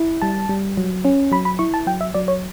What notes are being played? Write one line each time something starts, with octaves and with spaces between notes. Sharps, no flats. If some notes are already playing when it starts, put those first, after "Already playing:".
Already playing: E4
G3 A5
G3
F#3
C#4
F#3 B5
B5
E4 C#6
A5
F#3 G5
E5
F#3 D5
C#5